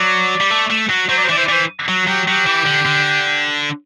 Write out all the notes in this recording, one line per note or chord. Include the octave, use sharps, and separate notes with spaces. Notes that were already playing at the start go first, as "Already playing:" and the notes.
Already playing: F#3 D5
G3
A3
A3
F#3
F#3 C5
D5
C5
E3 D5
C5
D5
E3 C5
F#3
F#3 G4
F#3 G4
E3
D3
D3